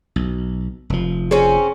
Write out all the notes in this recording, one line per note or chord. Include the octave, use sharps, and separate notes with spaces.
B1
F1 F3
C4 C#4 G#4